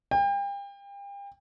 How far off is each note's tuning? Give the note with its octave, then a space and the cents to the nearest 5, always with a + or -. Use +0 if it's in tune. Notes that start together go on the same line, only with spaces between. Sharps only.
G5 +35